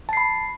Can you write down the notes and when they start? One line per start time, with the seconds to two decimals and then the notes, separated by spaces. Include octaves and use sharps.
0.09 A5
0.13 C7
0.17 B5